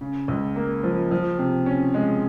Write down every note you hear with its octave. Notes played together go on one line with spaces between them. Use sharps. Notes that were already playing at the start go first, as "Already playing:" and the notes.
C#3
C#2
A#3
F3
F3
C3
C#4
G#3